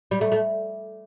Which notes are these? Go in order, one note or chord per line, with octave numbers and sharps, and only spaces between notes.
G3
A3
A3